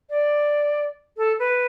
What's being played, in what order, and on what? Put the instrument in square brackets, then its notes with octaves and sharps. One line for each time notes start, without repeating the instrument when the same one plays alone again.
[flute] D5
A4
B4